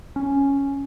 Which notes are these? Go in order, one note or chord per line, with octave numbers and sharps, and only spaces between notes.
C#4